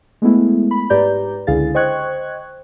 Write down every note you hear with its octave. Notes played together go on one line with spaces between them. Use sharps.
G#3 A3 B3 E4
B5
G#2 G4 B4 D5 A#5 G6
C#2 D3 E4 G#4 F5 A6
C5 D#5 G5 C#6 F#6 G#6